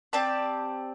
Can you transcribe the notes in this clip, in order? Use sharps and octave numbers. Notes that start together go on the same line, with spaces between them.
C4 G4 D5 A5